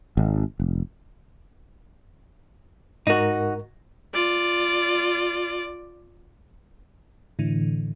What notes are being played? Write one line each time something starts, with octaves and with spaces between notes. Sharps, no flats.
G#1
F1
G#2 D#4 F#4 A#4
F4 D5
A2 D3 E3